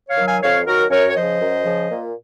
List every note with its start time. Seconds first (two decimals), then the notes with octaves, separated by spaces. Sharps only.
0.09 C#5 F5
0.17 D#3 F#3
0.26 F5 G#5
0.42 F2 C#5 F5
0.67 D#3 F#3 F#4 A#4
0.91 F#2 A#4 C#5
1.08 C#5
1.15 C#3 F3 C5 D#5
1.40 F#2
1.64 C#3 F3
1.89 A#2